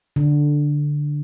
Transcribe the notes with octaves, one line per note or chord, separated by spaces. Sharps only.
D3